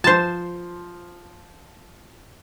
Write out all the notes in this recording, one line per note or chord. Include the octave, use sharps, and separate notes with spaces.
F3 C5 A5 C6